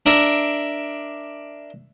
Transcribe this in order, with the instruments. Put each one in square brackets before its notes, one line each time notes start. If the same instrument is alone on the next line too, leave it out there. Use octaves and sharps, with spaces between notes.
[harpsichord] D4 A#4 E5